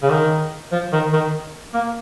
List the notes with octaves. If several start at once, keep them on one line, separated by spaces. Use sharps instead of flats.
C#3
D#3
F3
D#3
D#3
A#3